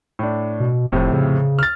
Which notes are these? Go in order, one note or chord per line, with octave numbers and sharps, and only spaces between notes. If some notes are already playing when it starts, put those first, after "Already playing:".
A2 D4
B2
F1 F2 A2 C3
C#3
F6 A6